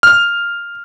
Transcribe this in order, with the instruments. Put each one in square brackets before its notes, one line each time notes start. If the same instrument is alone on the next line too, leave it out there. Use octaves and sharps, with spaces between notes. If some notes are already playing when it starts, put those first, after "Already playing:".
[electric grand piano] F6